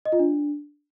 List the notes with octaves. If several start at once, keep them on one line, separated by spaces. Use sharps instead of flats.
D#5
F4
D4